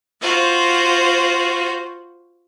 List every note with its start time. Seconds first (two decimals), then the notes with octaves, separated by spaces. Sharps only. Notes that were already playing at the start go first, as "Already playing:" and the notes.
0.20 F4 F#4 C5